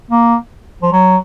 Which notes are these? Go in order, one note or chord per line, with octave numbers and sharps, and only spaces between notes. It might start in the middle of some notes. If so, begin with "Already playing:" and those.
A#3
F3
F#3